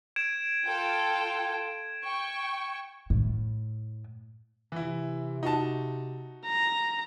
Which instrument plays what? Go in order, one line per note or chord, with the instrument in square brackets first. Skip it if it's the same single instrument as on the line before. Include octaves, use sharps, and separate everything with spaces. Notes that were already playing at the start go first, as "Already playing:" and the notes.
[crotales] G#6 D7 E7
[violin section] F4 A4 G5
G5 C#6
[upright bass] A2
[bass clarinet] C3 [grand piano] E3 E4
[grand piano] D#4 F#4 A5
[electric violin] A#5